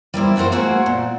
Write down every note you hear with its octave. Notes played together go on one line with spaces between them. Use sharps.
G3 A#3 E4 C5
F3 F#4 G4 A#4 C5
A3 A#3 F#4 G#4 C5
A#2